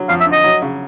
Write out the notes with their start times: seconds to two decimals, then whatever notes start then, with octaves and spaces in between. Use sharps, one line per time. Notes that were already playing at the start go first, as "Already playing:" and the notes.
Already playing: D3 F#3
0.09 F2 F5
0.20 E5
0.26 D3
0.32 D#5
0.44 F#3
0.62 C#3